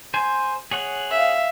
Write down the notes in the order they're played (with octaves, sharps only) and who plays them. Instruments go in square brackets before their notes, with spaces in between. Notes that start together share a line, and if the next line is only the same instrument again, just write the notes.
[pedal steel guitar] C5 G#5
G#4 C#5 F#5
[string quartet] E5 F5